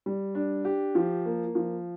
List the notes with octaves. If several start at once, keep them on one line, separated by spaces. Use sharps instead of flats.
G3
D4
G4
F3
A#3
F3